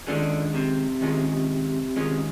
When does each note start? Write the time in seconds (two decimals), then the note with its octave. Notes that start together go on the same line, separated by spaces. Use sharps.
0.07 D3 D#3 G#3 C#4 F4 G#4
0.54 C3
1.01 D#3 G#3 C#4 F4 G#4
1.96 D#3 G#3 C#4 F4 G#4